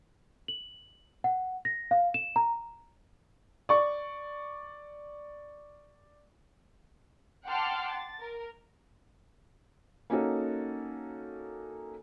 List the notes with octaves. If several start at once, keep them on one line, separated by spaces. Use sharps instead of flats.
F#7
F#5
A#6
F5
E7
A#5
D5 C#6
F#5 G5 A5 C6 D6 F6
A6
A#4
A#3 C#4 D#4 F#4 A4